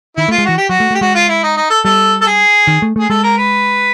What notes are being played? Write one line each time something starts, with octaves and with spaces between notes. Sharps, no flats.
D#3 E4
A3
F4
G#3
E3 F#4
G4
F#3 F#4
A3
A3
G4
G#3 F#4
F4
E4
D#4
D#4
A4
G3 A4
A4
G#4
D#3
A3
A3 G#4
G#3 A4
A#4
B4